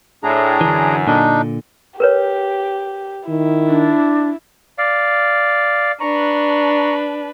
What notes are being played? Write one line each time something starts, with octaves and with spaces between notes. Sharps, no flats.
A2 D4 G#4 A#5
F#2 D3 E3
A#2 D3 D4 D#4
G4 A#4 B4 C#5
D#3 E4
D4
D5 F5
D4 B4 A#5 C#6